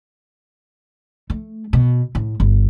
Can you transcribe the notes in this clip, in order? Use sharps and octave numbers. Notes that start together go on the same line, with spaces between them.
A3
B2
A2
G1